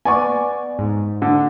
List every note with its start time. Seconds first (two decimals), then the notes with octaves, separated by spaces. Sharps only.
0.05 B3 D5 G#5 C#6
0.79 G#2
1.22 D3